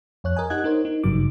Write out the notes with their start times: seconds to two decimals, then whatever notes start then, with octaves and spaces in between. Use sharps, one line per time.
0.24 F2 C#5 F#6
0.36 A#4 D#5 G#5
0.50 D#4 G4 D#5 F#5 F#6 G#6
0.64 D#4 A#4 C5 C#5
0.85 D#4
1.04 G#1 G2 C#3 F#3 D#4 D6